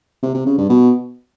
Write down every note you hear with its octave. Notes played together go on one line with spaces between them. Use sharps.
C3
C3
C#3
G2
B2